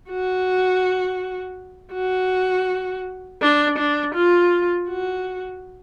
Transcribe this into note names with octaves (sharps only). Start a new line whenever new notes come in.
F#4
F#4
D4
D4
F4
F#4